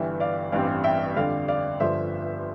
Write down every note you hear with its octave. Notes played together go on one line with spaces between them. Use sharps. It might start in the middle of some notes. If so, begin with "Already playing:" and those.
Already playing: G1 G2 E3 E5 G5
D5 F5
A1 G2 E3 G3 C4 D5 F5
E5 G5
F2 D3 G3 D5 F5
D5 F5
G1 G2 D3 F3 C5 E5